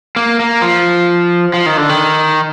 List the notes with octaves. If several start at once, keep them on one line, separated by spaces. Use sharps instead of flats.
A#3
A#3
F3
F3
D#3
D3
D#3